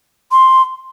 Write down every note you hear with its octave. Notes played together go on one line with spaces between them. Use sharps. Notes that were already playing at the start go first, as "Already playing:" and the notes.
C6